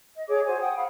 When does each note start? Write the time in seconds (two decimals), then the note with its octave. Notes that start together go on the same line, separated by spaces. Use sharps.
0.15 D#5
0.27 G#4 C#5 D6
0.45 F#4 C5 G#5
0.59 F#5 G5 D#6
0.77 F5 F#5 B5